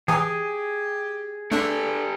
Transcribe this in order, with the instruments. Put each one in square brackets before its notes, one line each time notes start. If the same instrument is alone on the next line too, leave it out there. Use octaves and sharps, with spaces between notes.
[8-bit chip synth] E3 [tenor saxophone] G4 [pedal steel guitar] G#4 G#5 D#6
[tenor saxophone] D3 [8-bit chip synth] A3 D4 [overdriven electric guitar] G4 A4